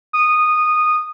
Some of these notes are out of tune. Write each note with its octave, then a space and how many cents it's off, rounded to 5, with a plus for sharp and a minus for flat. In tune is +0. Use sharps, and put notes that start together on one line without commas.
D#6 -15